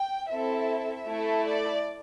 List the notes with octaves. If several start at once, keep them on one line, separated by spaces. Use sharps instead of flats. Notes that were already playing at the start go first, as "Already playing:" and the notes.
Already playing: G5
C4 E4 A4 E5
A3 E4 A4
D5